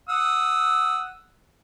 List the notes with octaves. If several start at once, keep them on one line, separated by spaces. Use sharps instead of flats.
F#5 D#6 E6